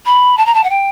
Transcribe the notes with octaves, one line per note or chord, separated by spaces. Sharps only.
B5
A5
A#5
A5
F#5
G5